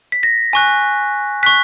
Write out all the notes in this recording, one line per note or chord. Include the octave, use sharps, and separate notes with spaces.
B6
A#6
G#5 C#6 F#6
C#6 F#6 B6